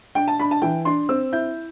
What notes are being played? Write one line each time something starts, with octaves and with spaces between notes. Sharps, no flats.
D4 G5
A5
D4 B5
A5
E3 G5
D4 C6
C4 E6
E4 G6